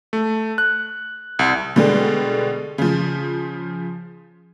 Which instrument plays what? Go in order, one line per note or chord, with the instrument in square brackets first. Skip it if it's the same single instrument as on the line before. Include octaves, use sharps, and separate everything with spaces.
[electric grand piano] A3
F#6
C2
[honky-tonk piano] B2 D3 G3 G#3
C#3 F3